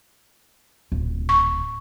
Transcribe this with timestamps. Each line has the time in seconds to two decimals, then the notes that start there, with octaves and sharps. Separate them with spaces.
0.92 D1 A#1
1.29 C#6